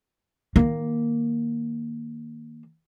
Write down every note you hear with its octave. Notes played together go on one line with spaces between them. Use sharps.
D#3 A#3